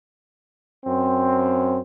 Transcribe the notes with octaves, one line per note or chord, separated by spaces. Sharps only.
F#2 C4